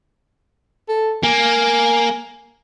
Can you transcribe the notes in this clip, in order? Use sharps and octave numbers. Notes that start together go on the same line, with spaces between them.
A4
A#3 G#5